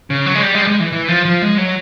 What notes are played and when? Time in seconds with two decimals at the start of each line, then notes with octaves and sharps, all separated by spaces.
0.10 C#3
0.26 F#3
0.35 G#3
0.42 G3
0.55 G#3
0.62 G3
0.67 G#3
0.80 E3
0.92 E3
1.08 F3
1.25 F3
1.42 G#3
1.58 F#3